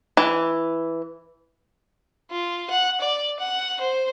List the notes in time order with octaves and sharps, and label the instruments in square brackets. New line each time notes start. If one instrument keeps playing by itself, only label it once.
[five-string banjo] E3
[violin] F4
F#5
D5
F#5
C5